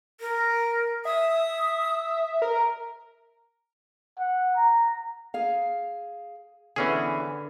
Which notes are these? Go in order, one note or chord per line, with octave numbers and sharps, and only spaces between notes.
A#4
E5 D#6
A#4
F#5
A#5
G#4 F5
D3 E3 B3 C#4 G#4